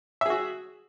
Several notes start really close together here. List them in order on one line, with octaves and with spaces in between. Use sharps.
E5 G#4 F#4